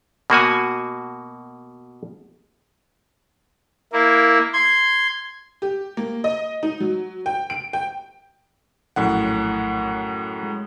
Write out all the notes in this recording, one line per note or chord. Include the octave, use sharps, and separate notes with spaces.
B2 A#3 F#4 G#5
A#3 E4
C6 G#6
G4
A#3
D#5
D#4
F#3
G5
D7
G5
A#1 F#2 A2 F#5
G#3